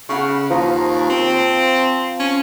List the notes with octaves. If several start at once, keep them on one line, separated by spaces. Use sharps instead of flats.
C#3 F#5 B5 C#6
D#2 F3 A#5 D#6
C4
C#4